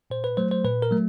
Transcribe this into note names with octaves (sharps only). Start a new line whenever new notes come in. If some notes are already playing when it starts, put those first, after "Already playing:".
A#2 C5
B4
F#3 A3 C5
C5
A#2 B4
A#4
F#3 A3